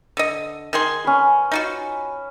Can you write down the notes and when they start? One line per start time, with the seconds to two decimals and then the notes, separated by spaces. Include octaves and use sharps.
0.17 D3 D#5
0.73 D#3 G#4 C6
1.05 C#4 B4
1.52 D#4 F4 F#4